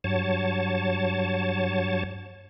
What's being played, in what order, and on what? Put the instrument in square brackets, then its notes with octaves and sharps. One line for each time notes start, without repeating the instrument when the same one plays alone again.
[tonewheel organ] G2 F#3 C#5 A5